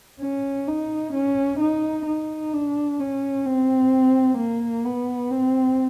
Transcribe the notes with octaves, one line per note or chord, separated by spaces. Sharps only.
C#4
D#4
C#4
D#4
D#4
D4
C#4
C4
A#3
B3
C4